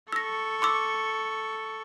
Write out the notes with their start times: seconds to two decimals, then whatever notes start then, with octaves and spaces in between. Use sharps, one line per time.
0.12 A4 C#6 E6 A#6
0.62 C6 D6 E6